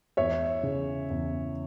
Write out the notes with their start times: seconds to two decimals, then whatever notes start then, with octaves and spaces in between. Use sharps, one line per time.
0.17 E2 C#5 E5
0.63 C#3
1.10 E2